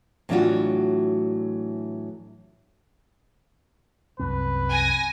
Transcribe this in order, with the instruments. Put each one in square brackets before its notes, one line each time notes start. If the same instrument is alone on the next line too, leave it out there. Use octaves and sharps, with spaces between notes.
[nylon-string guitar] A2 E3 F#3 D4 F4 F#4
[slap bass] C2 F#2 C4 [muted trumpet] B4
[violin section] G#5 A#6